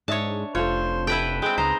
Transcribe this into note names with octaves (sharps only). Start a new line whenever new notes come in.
G#2 D4 C#5 D#5 E5 A5
F1 F4 A4 C5 C#5
E4 A4 B4 G5
G#3 C4 B4 G5
C#2 D#4 B4 C5 D#5 A#5